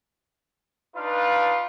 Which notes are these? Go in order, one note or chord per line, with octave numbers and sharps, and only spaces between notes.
D4 D#4 F4 B4 F5